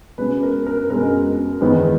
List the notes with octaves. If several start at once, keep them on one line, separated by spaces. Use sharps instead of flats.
B2 G#3 C#4 B4
A#4
A#4
B2 G#3 C#4 A#4
E2 D#3 G#3 B3